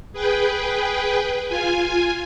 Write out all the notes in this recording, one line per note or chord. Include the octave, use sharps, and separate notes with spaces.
G#4 B4 G5
F4 G#5